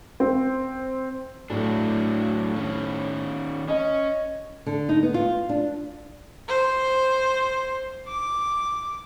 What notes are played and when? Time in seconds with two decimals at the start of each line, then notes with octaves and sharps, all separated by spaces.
0.20 C4
1.50 A2 F#3 A3 D4
2.56 D#3 C#4
3.68 C#4 D#5
4.66 D3
4.89 D#4
5.03 B3
5.14 F4
5.49 D4
6.48 C5
8.07 D6